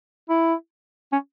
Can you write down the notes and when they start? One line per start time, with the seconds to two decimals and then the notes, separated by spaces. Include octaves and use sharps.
0.29 E4
1.12 C#4